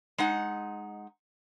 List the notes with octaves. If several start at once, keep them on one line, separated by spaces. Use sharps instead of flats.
G#3 D#4 F#5